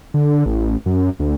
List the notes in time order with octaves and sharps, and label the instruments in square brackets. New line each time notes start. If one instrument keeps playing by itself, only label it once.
[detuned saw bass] D3
A1
F#2
D2